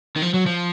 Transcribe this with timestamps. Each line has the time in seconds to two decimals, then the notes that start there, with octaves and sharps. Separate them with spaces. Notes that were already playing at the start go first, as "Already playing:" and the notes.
0.16 D#3
0.22 F3
0.34 F#3
0.46 F3